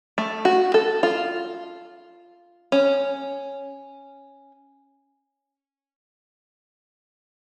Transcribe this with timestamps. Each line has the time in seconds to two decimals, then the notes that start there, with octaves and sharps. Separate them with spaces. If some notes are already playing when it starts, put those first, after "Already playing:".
0.18 A3
0.45 F#4
0.74 A4
1.03 F4
2.72 C#4